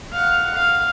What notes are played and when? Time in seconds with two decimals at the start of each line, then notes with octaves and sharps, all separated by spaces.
0.13 F5 F#5
0.55 F5